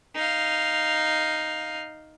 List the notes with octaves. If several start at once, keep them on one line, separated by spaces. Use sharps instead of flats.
D#4 F5